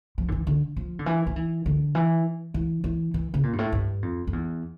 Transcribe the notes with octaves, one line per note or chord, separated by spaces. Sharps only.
F3
D3
E3
D3
F3
D3
E3
F3
E3
D3
E3
E3
E3
E3
C#3
A#2
G2
A2
G2
F2
F2
E2